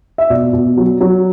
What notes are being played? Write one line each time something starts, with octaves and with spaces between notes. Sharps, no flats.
E5
B2 D5
B2
F#3
F#3